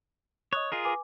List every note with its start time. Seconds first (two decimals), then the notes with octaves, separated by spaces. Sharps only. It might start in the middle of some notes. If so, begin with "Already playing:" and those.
0.53 C#5 D#5 D#6 F#6
0.72 F4 G#4 A#4
0.85 B4 G#5 D6